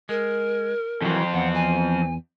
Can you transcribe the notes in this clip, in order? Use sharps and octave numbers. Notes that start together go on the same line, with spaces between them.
G#3 A#4
F2 E3 F#3 C4
E2 F#5
G#5